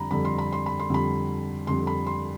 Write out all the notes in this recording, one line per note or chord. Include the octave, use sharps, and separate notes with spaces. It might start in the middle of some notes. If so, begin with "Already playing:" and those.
Already playing: F2 D3 G3 A#5 B5
F2 D3 G3 B5
C6
B5
C6
B5
C6
F2 D3 G3 B5
F2 D3 G3 C6
B5
C6